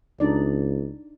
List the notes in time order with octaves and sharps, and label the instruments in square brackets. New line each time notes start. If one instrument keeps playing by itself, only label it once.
[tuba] C#2 [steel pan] D4 D#4 D5